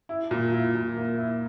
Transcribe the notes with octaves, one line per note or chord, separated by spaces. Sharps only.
E4
A#2
E4
A#2
A#3
E4